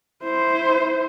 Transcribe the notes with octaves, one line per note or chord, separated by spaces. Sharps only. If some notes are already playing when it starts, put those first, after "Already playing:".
E4 C5